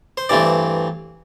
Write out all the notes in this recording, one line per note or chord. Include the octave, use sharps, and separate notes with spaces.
C5
G2 E3 A3 C4 D5